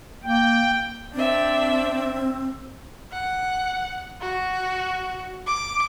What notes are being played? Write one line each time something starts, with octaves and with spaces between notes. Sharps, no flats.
A#3 G5
C4 D4 E5
F#5
F#4
D6